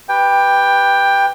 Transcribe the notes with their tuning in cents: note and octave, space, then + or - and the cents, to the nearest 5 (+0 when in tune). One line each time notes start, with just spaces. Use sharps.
G4 +0 B4 +0 G5 +15